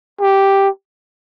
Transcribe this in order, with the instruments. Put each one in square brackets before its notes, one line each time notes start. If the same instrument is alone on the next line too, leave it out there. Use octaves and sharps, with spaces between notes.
[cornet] G4